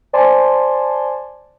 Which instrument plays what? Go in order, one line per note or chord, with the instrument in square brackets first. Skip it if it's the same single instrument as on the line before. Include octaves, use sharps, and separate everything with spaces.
[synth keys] C5 D5 G#5 A5 C6